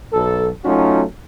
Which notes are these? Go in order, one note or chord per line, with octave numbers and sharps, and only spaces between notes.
B1 A4
F#3 A3 C#4 D#4 F4 F#4